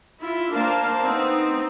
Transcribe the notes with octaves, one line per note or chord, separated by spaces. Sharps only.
E4 F4
A#3 D4 A#4 C5 F5 A5
B3 C4 D#4